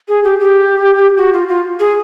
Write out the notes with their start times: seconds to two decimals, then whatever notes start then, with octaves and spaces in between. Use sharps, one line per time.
0.08 G#4
0.24 G4
0.40 G4
1.17 F#4
1.33 F4
1.48 F4
1.80 G#4